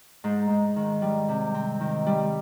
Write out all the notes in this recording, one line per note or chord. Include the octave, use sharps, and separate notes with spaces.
G#2
G#2
D#3
G3
C3
C4
D#3
G3